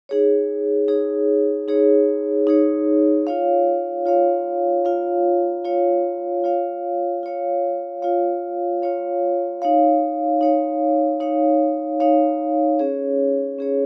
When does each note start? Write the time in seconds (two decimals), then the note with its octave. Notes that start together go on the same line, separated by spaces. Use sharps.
0.09 D#4 G#4 C#5
0.88 D#4 G#4 C#5
1.68 D#4 G#4 C#5
2.47 D#4 G#4 C#5
3.27 F4 C#5 F5
4.06 F4 C#5 F5
4.85 F4 C#5 F5
5.65 F4 C#5 F5
6.44 F4 C#5 F5
7.23 F4 C#5 F5
8.02 F4 C#5 F5
8.82 F4 C#5 F5
9.62 D#4 C#5 F5
10.41 D#4 C#5 F5
11.20 D#4 C#5 F5
12.00 D#4 C#5 F5
12.79 C#4 G#4 C#5
13.58 C#4 G#4 C#5